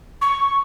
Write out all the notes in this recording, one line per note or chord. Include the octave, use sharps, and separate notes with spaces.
C#6